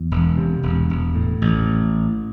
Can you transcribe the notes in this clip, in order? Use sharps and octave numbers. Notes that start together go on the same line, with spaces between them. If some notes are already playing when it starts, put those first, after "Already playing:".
Already playing: E2
E1
C3
E1
E1
A2
A1